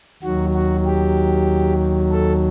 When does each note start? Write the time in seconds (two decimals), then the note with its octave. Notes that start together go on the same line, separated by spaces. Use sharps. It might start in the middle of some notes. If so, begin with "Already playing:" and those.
0.23 D#2 D#3 F#3 F#4
0.54 F#4
0.86 G4
2.11 A4